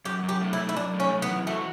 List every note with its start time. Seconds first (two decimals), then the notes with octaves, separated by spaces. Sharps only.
0.05 F#2 G4
0.23 F#2
0.29 G4
0.41 A3
0.53 E4
0.58 F#2
0.69 E4
0.75 F#2 D4
0.94 A3
1.00 C#4
1.11 F#2
1.22 B3
1.29 E3
1.47 A3 F#4